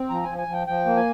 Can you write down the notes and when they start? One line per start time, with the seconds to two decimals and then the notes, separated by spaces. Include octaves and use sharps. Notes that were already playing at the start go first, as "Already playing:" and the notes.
Already playing: C4
0.10 F3 A#5
0.23 F3 G#5
0.38 G#5
0.48 F3 G5
0.67 F3 G5
0.86 A#3
0.96 G#5